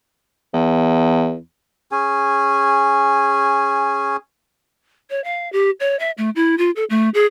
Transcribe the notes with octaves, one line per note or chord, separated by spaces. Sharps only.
E2
C#4 G#4 G#5
C#5
F5
G4
C#5
E5
A3
E4
F4
A4
A3
G#4